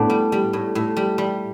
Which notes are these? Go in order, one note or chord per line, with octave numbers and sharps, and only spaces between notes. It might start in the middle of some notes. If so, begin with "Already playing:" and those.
Already playing: A2 B3 D4
G3
G3
A2
A2
G3
G3